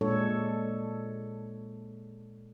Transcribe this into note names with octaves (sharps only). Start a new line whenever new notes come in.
A#2 G#3 D4 A4 C#5